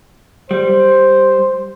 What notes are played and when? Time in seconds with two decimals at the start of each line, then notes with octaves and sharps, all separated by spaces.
0.51 G3 C5